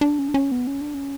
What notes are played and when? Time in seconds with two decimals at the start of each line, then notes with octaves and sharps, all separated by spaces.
0.01 D4
0.19 C#4
0.28 D4
0.34 C#4
0.52 B3
0.67 C#4
0.81 D4
0.94 C#4